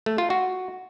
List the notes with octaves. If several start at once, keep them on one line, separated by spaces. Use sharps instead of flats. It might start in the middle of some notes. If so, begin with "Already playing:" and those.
A3
F4
F#4